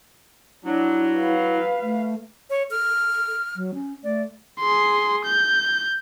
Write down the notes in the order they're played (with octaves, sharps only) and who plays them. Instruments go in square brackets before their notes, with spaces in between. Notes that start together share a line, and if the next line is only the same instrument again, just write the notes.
[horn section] F#3 [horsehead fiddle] D4 [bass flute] E4
[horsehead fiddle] B4 F5
[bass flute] A3
[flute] C#5
[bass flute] A4 [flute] F6
[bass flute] F#3
C#4
[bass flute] A3 [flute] D5
[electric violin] G#4 C6
G6